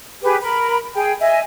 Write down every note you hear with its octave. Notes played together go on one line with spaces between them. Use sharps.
G4 G#4 B4
A#4 B5
G#4 G5
D#5 E5 G#5